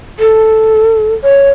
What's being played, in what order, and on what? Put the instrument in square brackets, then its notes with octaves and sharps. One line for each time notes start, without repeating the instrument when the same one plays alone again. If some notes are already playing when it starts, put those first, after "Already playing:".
[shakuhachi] A4
[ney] C#5